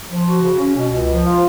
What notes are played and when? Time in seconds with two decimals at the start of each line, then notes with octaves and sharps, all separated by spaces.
0.10 F3
0.26 F#4
0.42 C#3
0.59 C#4
0.76 B2
0.93 C#2
1.08 F3
1.25 F4